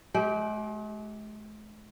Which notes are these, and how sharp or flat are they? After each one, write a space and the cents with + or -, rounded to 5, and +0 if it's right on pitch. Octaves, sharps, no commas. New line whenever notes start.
G#3 +45 G4 -15